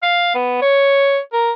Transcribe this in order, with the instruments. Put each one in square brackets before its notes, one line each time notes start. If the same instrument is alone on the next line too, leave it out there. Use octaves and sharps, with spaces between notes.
[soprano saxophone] F5
B3
C#5
A#4